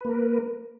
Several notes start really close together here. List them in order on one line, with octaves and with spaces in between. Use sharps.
B4 A#3 A#4